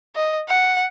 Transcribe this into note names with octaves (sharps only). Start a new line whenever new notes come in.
D#5
F#5